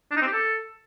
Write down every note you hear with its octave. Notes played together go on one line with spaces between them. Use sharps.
D4
D#4
C4
G4
A4